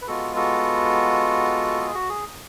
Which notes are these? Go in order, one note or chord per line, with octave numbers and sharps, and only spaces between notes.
B4
G#3 B3 F4 F#4 A4
F#4 A4
G#4
F#4
G#4